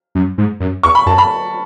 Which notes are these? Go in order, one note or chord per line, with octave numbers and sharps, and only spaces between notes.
F#2
G#2
F#2
E2 C#6
B5
F#2 A5
B5